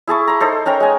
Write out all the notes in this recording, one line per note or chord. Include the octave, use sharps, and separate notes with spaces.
E4 G#4 A5 C#6
A#5 C6
D#4 A4 C5
C#4 A#4 G5 A#5
G#3 G#5